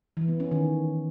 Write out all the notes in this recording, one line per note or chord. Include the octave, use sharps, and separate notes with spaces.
E3
B3
C#4
D#3